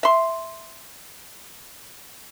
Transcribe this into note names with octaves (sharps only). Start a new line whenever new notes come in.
E5 C6